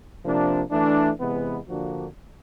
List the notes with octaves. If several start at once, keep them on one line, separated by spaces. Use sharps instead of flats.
C3 F3 A#3 D4
E3 A3 D4
C3 E3 G#3 B3
D3 F3 A#3 D4 F#4